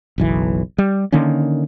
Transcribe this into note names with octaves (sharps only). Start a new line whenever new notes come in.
F#1 B1 E3
G3
D3 D#3 A#3 C#4